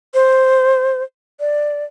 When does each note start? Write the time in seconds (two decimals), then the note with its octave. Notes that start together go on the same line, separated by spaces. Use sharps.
0.14 C5
1.40 D5